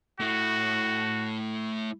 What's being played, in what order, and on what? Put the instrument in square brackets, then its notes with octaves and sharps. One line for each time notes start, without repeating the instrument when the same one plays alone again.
[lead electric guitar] A3 E4 [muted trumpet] F#4